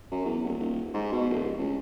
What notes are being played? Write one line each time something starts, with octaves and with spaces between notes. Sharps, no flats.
F#2
E2
D#1
D#1
G#2
B2
D1
C#2